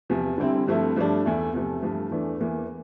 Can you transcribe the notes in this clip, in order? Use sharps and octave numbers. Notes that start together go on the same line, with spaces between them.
E2 C3 F3
D3 G3 C4 E4
G2 F3 A3 C4 E4
G2 F3 A3 D4
E2 E3 A3 E4
E2 C3 F3 A3
G2 F3 A3
E2 E3 A3 D4
E2 E3 A#3